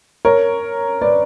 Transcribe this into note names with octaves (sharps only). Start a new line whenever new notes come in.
A#4 C#5
B4 D5